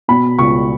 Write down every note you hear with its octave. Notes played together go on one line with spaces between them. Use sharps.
B2 B5
C#2 C#6